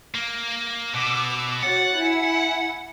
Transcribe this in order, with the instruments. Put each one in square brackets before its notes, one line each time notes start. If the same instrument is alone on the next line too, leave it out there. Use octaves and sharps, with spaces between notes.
[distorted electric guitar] A#3
[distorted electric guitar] B2 [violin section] D6 E6
[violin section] F#4 C#5 A6 [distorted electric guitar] F#5
[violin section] E4 G#5